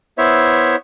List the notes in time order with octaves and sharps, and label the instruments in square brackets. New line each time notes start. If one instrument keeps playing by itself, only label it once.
[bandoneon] B3 E4 C5 C#5 E5